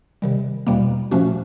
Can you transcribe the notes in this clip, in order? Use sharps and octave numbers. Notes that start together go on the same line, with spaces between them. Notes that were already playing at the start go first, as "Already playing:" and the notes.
C3 D#3 G3
E2 B2 G3 A#3
A#2 F3 A3 C#4 F#4